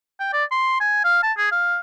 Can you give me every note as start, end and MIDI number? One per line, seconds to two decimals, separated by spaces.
0.20 0.32 79
0.33 0.44 74
0.51 0.78 84
0.80 1.01 80
1.04 1.22 77
1.23 1.32 81
1.38 1.51 68
1.52 1.80 77